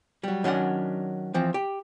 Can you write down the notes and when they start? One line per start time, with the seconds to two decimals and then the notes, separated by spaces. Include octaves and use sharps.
0.23 F#3 G3
0.44 D#3 F#3 C#4 D4 F#5
1.34 E3 F3 C4
1.54 G4